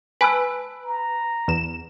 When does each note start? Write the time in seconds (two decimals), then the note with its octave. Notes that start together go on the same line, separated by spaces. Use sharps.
0.21 B4 G#5 A5 E6
0.85 A#5
1.48 E2 E7